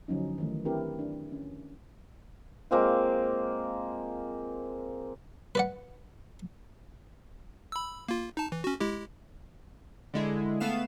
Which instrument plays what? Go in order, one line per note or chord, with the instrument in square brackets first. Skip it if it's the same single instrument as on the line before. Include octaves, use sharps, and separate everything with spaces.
[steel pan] D3 F3 F#3 C#4 D#4
D#3 E3 A3
C4 D4 E4 G4 A#4 B4
D4
C#4
[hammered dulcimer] G#3 A#3 C4 F4
[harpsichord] B4 D5 F#5
[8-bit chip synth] B5 E6
A#3 F4
D#4 A5
E3
C#4 F#4
G#3 E4 G4
[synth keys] D3 G#3 E4
A3 B3 F5 E7